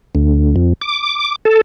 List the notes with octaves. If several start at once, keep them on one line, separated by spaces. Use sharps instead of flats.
D2
F2
D6
A4